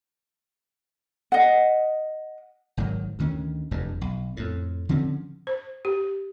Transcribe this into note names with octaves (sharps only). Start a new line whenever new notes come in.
D#5 F#5
G#1 G#2 D#3 F#3
D2 D#3 C#4
F1 E2 G2
B1
F2 A2
D3 F3 C4 C#4
C5
G4